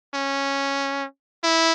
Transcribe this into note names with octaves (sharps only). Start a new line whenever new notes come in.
C#4
E4